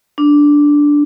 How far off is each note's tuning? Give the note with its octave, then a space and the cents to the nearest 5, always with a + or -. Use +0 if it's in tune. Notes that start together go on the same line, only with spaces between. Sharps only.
D4 -5